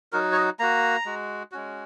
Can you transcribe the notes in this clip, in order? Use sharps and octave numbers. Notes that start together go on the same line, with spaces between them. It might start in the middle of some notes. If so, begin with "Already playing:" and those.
F#3 D#4 F#4 A#4
C#5
D#5
A#3 F#4 A#5
G#3 F#4
G#3 C#4 F#4